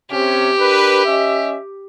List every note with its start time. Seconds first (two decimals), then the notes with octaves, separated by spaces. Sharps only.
0.11 C3 C#4 G4
0.59 D4 A#4 B4
1.06 C#4 D#5 E5